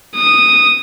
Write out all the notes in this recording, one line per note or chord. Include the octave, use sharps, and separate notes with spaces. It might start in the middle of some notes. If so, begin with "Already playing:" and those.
D#6